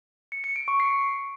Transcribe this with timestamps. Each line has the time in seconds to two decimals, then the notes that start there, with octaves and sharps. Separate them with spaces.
0.32 C#7
0.44 C#7
0.56 D7
0.68 C#6
0.80 C7